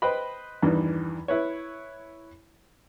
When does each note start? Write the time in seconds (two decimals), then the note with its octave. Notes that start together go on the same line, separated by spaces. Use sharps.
0.02 B4 C5 D#5 G5 B5
0.63 E2 G2 D#3 E3
1.28 E4 B4 C#5